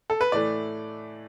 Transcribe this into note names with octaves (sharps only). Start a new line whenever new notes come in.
A4
B4
A2 E3 A3 D5